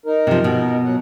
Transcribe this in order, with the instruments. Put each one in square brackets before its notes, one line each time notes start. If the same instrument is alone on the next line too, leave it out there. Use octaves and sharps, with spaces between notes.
[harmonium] D#4 A#4
[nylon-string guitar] C3 F3
B2
[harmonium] F#3 F#5